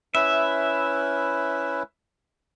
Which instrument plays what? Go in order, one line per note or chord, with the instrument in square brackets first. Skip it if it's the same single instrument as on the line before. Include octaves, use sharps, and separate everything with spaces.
[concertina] C#4 E4 B4 [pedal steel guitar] E5